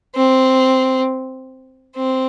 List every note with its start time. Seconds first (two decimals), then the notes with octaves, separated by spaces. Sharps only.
0.16 C4
1.96 C4